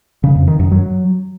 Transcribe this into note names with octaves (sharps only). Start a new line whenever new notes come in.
C#3
F2
D#3
F#2
F#3